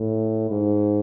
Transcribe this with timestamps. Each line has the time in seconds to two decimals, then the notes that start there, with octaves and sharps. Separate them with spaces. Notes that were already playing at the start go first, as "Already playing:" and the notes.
Already playing: A2
0.51 G#2